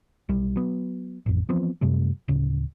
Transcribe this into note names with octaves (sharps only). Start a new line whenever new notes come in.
B1 G3
F#3 B3
A1 F2
E3 F3 B3 C4
F#2 C3 G3 A3
D1 C#3